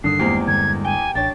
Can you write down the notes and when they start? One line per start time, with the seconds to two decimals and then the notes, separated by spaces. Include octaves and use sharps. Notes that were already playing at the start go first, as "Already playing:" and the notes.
0.04 G2 D3 D#3 D#6 C7
0.19 E2 G#3 A#3 C4 G4
0.48 G2 D3 G#6
0.85 G5 G#5
1.15 A1 D4 C#5 G5 A6